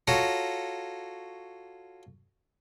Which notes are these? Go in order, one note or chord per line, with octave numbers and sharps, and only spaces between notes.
F4 F#4 A4 C#5 A#5